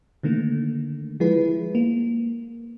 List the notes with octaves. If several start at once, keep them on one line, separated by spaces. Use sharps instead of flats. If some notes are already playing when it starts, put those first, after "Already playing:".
D3 D#3 A3 A#3
F3 G#3 E4 G#4 B4
A#3